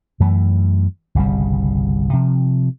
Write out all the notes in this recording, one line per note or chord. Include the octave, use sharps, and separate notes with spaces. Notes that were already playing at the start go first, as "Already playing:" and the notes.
F#2 E3 A3
G1 C2 C#3 G3
C3 F3